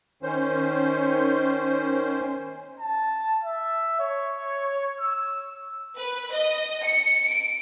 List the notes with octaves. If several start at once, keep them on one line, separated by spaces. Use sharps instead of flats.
D#3 C#4 C5
A5
E5
C#5
E6
B4
D#5
C#7
D7